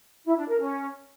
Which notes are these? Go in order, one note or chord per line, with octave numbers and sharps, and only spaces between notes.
E4
D4
A#4
C#4